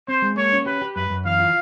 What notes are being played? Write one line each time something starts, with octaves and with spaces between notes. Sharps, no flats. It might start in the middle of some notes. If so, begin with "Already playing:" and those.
C4 C5
G#3
A#3 C#5
C#4
G4 B4
G4
F#2 B4
F#2
E3 F5
F4